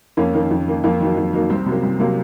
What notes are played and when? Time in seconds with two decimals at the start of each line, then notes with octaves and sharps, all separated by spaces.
0.17 F2 A#3 C#4
0.33 D#3 A#3
0.51 F2
0.67 D#3 A#3
0.84 F2 A#3
1.00 D#3 F#3 A#3
1.17 F2
1.33 D#3 F#3 A#3
1.50 C2 C4
1.66 C3 F#3 A#3
1.83 C2
2.00 C3 F#3 A#3